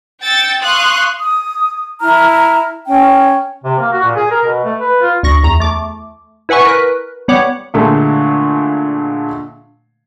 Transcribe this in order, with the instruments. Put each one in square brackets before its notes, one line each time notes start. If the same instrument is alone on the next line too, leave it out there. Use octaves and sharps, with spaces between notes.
[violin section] G5 E6 G6 A6 C#7
F5 C6 C#6 D#6 F#6
[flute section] D#6
E4 A5 A#5 F6
C#4 G5
[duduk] C3
A#3
F#4
A#2
G#4
A#4
B2
A3
B4
F4
[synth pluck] D2 C#6 A#6
E2 A#5
A3 D6
E4 B4 F#5 G#5 C#6
A#4 B4 F#6
G3 B3 C#5 F#5 D6
[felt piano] A#2 D3 G#3 A3